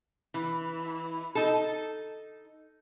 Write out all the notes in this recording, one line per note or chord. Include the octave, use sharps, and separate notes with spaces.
E3
D#4 A4